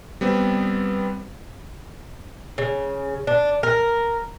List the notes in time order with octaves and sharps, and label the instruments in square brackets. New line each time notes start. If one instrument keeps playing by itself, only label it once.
[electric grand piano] G3 B3 C4
[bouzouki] C#3
D4
A#4